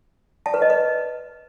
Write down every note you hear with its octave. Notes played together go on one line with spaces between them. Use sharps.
A5
B4
D#5
B4